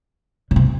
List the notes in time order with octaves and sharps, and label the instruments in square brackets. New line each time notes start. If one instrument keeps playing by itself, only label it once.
[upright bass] C#3
C3